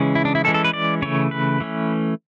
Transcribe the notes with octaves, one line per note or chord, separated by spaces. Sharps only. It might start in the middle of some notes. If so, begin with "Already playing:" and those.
Already playing: C#3 E3 G#3 C#4
E4
D4
E4
E3 G#3 C#4 A4
A4
B4
D5
C#3 E3 A3 C#5
B4
E3 A3 C#4